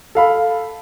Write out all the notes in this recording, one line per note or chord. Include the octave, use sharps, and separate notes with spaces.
A4 F5 B5